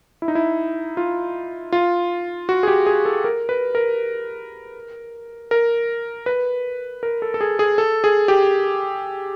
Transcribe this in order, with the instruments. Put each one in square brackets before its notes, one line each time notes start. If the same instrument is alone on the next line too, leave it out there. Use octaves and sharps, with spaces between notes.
[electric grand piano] E4
D#4
E4
F4
F4
F#4
G#4
G4
G#4
A4
A#4
B4
A#4
A#4
B4
A#4
A4
A4
G#4
G#4
A4
G#4
G4